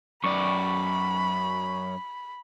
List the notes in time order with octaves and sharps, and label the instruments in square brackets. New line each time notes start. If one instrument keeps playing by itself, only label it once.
[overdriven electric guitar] F#2 D5 [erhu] B5 [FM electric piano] C#6